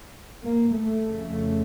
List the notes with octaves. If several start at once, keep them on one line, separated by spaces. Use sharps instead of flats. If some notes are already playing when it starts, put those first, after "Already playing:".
A#3
A3
F2 C#3